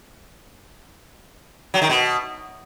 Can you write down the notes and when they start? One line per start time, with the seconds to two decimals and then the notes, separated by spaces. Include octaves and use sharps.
1.74 F#3
1.82 D#3
1.89 B2